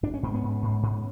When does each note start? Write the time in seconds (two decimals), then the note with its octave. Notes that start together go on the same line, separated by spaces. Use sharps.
0.03 G#2 D4
0.14 C#4
0.23 G#2 C4
0.34 B3 C#4
0.43 G#2
0.62 G#2
0.83 G#2